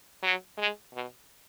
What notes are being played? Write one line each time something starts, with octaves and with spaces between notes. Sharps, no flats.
F#3
G#3
B2